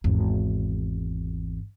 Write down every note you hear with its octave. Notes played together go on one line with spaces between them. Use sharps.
G#1 E2